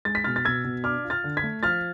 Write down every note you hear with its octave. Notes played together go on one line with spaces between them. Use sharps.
G#3 A6
B6
B2 F6 A6
A6
B2 E6 G#6
B2
D4 D6 F6
F4
F6 A6
D3
G#6 B6
A3
F3 F6 A6